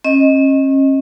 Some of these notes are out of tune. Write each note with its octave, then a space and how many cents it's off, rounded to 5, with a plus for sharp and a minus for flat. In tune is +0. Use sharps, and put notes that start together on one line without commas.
C#4 -35 D#5 +5